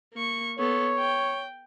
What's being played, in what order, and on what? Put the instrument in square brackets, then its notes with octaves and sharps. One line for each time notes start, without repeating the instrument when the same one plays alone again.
[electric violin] A#3 C#6
[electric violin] B3 A4 [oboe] C#5
[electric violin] G5